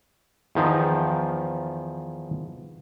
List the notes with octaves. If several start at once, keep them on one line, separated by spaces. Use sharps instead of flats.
E2 D#3 F3